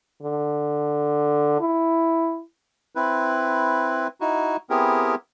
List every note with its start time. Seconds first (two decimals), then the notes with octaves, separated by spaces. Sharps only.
0.23 D3
1.61 E4
2.95 C4 E4 B4
4.21 D#4 E4 F#4
4.70 B3 C4 E4 G4 G#4 A#4